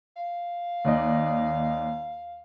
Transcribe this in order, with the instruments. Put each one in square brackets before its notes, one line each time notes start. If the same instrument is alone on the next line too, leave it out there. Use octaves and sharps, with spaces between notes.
[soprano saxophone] F5
[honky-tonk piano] D#2 D5 D#5